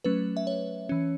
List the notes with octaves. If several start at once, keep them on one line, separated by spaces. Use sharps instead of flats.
F#3 A3 C#4 B4
E5
C#5
E3 C#4